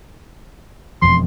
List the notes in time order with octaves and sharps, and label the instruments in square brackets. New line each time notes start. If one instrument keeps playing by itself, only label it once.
[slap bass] E1 F2 F3 [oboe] C6